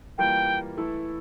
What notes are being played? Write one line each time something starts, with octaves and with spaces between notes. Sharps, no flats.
E3 G3 A#3 F4 G5
E3 A3 E4 A4